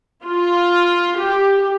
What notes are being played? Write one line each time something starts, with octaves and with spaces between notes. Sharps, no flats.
F4
G4